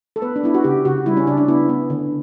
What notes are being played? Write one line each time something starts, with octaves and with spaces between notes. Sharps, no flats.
A4
B3 B4
D4
B3 E4
F#4
C#3 G4
C#3 F#4
G3 E4
C#4
C#3 D4
D4
B3 E4
B3
D3